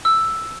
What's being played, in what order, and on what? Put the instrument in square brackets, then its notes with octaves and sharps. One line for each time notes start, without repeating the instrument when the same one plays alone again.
[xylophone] E6